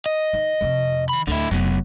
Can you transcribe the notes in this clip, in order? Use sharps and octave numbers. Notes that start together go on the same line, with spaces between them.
D#5
D#3
F2 C3
D#3 B5
D2 D3 E4
F1 F#3 B3